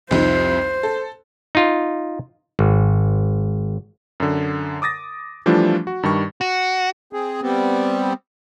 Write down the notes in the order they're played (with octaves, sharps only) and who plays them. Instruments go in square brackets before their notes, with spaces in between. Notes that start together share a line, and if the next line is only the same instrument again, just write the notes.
[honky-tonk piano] C2 F2 D#4 [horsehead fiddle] C5
[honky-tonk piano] A4
[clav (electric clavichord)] D#4 F4
G#1
[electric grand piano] F#2 D3
D6 D#6 A6 A#6
E3 F3 G3 A3 D4 F4
F#4
G2 D#3 G3 C#6
[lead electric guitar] F#4
[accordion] C4 G#4
G3 B3 C4